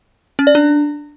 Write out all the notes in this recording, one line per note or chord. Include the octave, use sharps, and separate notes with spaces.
C#4
D5
D4